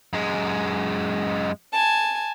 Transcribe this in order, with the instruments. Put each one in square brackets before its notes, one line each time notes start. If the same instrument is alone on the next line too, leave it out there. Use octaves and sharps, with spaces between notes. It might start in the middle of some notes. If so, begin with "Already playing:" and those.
[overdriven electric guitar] F#2 G#3
[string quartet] G#5 A5